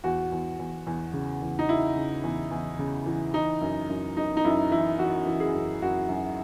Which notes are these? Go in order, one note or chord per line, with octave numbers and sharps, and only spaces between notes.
E2 F#4
E2
E2
E2
C#3
E2
D#4
C#3 E4
C#3
E2
E2
C#3
E3
E3 D#4
F#2
F#2
F#2 D#4
D#4
F#2 E4
E3 E4
E3 F#4
E3
G#4
F#2
F#2 F#4
F#2